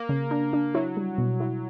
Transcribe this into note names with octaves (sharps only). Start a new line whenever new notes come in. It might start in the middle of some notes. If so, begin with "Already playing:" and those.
Already playing: A#3
C#3
D4
D4
F#3 E4
G3
B2
E4